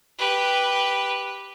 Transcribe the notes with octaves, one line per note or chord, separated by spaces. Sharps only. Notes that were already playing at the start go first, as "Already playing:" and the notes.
G4 B4